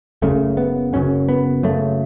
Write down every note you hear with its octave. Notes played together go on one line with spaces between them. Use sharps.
F#1 F#2 C#3 A3
B3
F#1 F#2 C#3 C#4
B3
F#1 F#2 C#3 A3